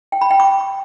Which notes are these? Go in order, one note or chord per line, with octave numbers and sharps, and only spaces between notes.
G5
B5
G5
D6